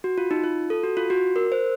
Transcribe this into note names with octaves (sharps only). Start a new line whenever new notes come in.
F#4
F4
D#4
F4
A4
F#4
F4
F#4
A#4
C5